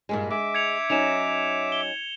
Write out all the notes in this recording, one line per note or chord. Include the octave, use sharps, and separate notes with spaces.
G2 A#2 G#3
G#3 E5 D6
G#6 C#7 F7
F#3 C#4 D#4 E7 F7
G7